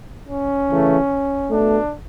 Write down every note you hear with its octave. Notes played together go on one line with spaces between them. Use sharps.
C#4
C#3 E3 A3
B2 A3 D4